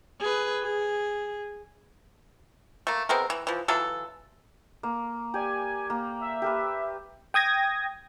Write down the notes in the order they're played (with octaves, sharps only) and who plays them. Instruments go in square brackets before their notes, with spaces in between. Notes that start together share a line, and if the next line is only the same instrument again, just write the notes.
[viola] G#4 B4
G#4
[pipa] A3 A#3
G#3 B3 C4 A#4
E3
E3 F3
E3 F#3 F4 A4
[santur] A#3
[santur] G4 D5 [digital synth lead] G#5
[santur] A#3
[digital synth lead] E5
[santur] G4 A#4 B4
[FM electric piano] G5 D#6 G#6 A#6